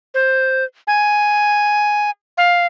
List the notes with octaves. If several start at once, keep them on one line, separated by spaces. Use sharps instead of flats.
C5
G#5
F5